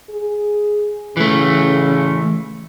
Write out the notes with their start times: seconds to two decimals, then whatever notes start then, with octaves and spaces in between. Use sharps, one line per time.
0.10 G#4
1.17 C#3 E3 A3